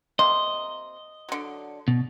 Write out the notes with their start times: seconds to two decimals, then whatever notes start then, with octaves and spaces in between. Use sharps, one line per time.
0.19 C3 A#3 D#5 C6
1.29 D3 F#3
1.88 B2